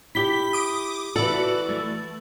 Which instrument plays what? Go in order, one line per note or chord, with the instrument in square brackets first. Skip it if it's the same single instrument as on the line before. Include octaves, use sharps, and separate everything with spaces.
[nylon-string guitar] E4 G4 [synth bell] B6 G7
[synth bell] D6 D#6
[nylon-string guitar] E3 A4 [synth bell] F#4 D5
[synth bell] A3